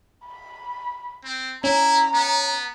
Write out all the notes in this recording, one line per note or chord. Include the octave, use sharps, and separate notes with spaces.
B5
C4
C#4 E4 A#5
B3